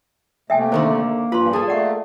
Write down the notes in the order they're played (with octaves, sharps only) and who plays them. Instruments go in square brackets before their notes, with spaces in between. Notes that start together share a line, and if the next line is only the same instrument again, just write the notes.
[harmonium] C3 A3 [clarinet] A#3 [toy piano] E5 G5 G#5
[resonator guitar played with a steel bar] D3 D#3 A#4 [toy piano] C5
[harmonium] G2 A#2 F3 [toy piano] F4 C6 [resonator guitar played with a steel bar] B4
[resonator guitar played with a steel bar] G#4 A4 [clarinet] A5
[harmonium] A3 A#3 [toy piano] D5 F#5 C#6